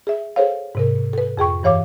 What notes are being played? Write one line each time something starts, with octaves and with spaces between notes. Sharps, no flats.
G#4 E5
G#4 A4 C5 C#5 F5
G#2 C3 A#4
A4 B4
F2 G#4 G5 C#6
G2 E3 C#5 F5 D6